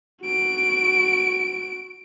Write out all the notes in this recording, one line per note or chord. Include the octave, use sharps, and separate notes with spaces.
F#4 D7